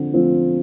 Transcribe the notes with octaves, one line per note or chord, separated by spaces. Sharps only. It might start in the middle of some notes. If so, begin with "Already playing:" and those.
Already playing: D3 F3 C4
F3 C4 F4